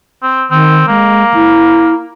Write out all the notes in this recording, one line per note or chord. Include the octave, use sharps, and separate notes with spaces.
C4
D#3 C4
G#3 A#3
E4